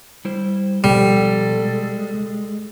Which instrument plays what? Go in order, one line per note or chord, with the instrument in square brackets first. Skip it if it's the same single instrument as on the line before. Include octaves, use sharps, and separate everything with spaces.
[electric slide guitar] G3 E4 C5
[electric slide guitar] B2 F3 [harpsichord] G3 [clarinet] A4
[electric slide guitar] G#3